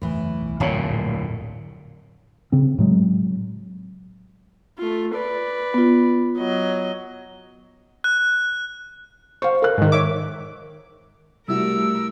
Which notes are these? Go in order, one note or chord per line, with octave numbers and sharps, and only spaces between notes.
F#1 E2 A2 E3
D1 B1
D1 F#2 A#2 C#5 F5
A#1 F2 A2
C#3 C4
A2 F#3 G#3
A3 F4
B4 D5
B3 F4
F#3 D#5
F#6
C5 F5 C#6
A#4 F#6
G#2 D#3
C#5 E5 D6
C3 G3 A3 E4 F#4 A#4 E6